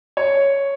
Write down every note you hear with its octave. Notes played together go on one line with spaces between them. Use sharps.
C#5